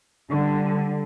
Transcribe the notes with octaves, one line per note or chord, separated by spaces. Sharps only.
D3 G3